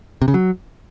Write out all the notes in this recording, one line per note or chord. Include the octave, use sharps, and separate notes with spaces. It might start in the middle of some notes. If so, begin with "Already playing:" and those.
C3
C#3
F#3